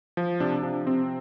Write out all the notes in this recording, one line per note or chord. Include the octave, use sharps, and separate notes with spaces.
F3
C3 D4
F3 D4
C3 C4